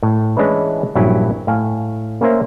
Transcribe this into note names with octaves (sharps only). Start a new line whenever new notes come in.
A2
E3 G#3 C#4 D4 E4 B4
A#1 G2 F#3 C#4 E4
A2 F5 G#5
A#3 C#4 A#4 C5 E5